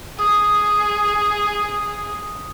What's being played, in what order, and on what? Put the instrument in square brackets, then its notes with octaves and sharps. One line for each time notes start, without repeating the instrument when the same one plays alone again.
[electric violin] G#4 [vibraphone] D#6